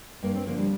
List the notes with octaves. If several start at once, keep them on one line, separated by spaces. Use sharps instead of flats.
G2 A#3
C4
D3 F3 A#3
G3